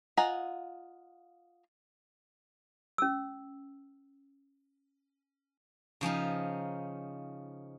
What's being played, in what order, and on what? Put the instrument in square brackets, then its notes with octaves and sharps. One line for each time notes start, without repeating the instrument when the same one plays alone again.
[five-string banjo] F4 D#5 F#5 G#5 A#5
[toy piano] C#4 E6
[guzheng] C#3 F3 C#4 D#4